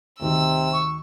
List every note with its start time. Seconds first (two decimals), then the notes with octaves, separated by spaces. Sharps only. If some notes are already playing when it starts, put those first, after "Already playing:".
0.20 D2 C3 D#3 E6
0.72 C#6